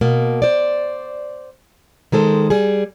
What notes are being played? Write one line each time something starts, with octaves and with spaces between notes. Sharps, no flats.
B2 A#3
C5 D5
D#3 G#3 A4 C5
G3 G#4